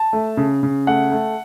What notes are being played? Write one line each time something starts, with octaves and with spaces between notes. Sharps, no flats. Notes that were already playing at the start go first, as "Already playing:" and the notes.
Already playing: A5
A3
C#3
C#3
A3 F#5
A3